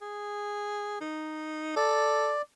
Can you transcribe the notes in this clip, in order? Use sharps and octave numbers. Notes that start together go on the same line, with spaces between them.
G#4
D#4
A4 D5